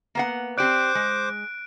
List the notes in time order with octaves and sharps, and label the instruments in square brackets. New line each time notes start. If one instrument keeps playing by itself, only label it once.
[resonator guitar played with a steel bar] A#3 B3 F#5
[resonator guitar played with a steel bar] C4 G4 D5 [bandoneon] C5 D6 [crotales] F#6 D7
[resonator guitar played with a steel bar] G#3